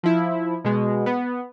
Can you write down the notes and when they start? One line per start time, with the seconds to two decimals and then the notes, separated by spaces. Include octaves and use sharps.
0.03 F3 E4
0.65 B2 G#3
1.06 B3